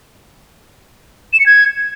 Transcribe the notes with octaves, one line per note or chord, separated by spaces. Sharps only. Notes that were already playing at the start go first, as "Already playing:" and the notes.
E7
C#7
G#6